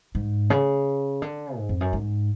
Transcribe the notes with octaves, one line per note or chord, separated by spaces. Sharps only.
G#2
C#3
D3
G#2
F2
F#2
G#2